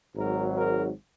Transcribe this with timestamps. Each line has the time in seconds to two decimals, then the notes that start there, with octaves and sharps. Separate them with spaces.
0.16 G#1 G#2 F#3 A#4
0.55 A#4